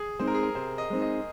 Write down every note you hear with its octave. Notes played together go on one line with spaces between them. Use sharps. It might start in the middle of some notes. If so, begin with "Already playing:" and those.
Already playing: G#4
G#3 C4 D#4 C5
A#4
G#4
A#4
C3 C5
D#5
G#3 C4 D#4
D#5